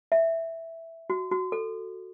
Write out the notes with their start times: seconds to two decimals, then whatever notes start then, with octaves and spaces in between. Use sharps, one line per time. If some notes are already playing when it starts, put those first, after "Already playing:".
0.12 E5
1.10 F#4
1.31 F#4
1.52 A4